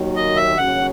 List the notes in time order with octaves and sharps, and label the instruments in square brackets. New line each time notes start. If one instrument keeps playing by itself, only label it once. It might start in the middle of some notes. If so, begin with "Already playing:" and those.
Already playing: [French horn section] D#2 D#3 F#3
[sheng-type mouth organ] D#5
E5
[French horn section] D#2 C#3 F#3 C#4 F#4 [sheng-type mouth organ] F#5